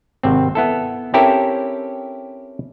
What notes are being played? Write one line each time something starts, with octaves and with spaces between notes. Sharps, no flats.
G#1 C3 C4
B3 E4 A4
C4 C#4 E4 G4 A4 A#4